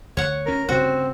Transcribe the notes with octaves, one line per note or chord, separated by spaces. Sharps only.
D2 C#5 F#5
D2 C#4 A#4
D2 G2 C#3 C4 F#4